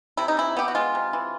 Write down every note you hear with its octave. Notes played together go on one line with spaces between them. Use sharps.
C3 E4
D#4
E3 E4
B3 G4
F#4
G#3 F4
C3
E3